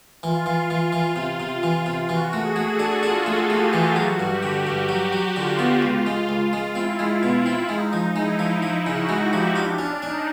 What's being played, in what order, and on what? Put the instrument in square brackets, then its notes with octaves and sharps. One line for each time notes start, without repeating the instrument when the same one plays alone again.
[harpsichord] E3 [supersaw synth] F4
[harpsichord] E3
[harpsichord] E3 [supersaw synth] F4
[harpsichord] E3
C3
C3
E3
C3
[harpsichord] E3 [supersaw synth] F#4
[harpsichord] A3
[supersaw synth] G#4
[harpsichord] A3
[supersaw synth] A4
[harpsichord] D4
[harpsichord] D4 [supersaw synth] F4
[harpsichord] A3
[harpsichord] A3 [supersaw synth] G4
[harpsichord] E3
[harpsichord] F#3 [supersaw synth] F#4
[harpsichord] G2
[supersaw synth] G4
[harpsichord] D3
[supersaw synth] G4
[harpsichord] G2
[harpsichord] F#3 [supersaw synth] F#4
[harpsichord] F#3
[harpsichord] D3 [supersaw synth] F4
[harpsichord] B3
C#2
G#3
C#2
G#3
[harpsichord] C4 [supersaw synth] E4
[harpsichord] G#3
B2
C4
[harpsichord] G#3 [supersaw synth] D#4
[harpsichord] F3
[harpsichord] G#3 [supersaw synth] E4
[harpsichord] F3
[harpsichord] F3 [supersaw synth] E4
[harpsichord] C#3
[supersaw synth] F#4
[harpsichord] G#3
[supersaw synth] G4
[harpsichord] F3
[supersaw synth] D4 [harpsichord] F4
[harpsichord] C#4
[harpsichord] C#4 [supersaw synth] D#4